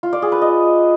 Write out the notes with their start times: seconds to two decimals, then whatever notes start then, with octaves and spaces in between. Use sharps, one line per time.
0.03 F4
0.13 D5
0.22 G#4
0.32 B4
0.42 D#5